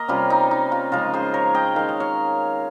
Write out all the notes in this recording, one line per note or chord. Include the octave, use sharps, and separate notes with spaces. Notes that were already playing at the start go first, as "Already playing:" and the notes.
Already playing: A#3 A#4 D#5
C3 G3 C#4 F4
D#4
D#4
F4
C#3 F3 G#3 F4
G#4 C5
A#4 C#5
D#5 G5
D#3 G#3 C#4 F5
D#5
C#5 F5